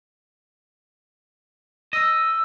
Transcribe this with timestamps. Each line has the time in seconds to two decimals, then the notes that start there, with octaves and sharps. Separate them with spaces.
1.93 D#5 E6